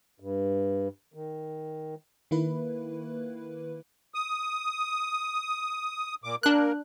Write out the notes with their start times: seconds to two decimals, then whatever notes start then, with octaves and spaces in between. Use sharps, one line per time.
0.20 G2
1.14 D#3
2.31 D#3 A#3 E4 B4
4.14 D#6
6.24 A#2 D6
6.43 A#3 D4 A#4 F#6